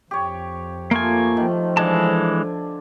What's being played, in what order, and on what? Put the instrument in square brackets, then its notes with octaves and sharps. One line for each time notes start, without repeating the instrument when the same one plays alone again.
[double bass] F2 [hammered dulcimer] G4 C#5
[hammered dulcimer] F3 A3 F4 [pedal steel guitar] A#3 G#5
[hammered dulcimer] D#3 [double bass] F3
[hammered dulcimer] D3 D4 G#5 [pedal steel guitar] E3 G#3 A5